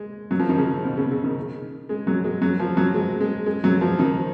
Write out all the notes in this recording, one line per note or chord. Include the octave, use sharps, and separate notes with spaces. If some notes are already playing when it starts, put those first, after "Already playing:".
Already playing: G#3
F#3
F3
D#3
C#3
B2
C#3
C#3
D#3
G#3
F#3
G#3
F#3
F3
F#3
G#3
G#3
G#3
F#3
F3
D#3